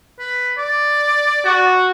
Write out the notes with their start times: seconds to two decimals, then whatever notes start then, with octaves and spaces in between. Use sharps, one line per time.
0.19 B4
0.57 D5
1.45 F#4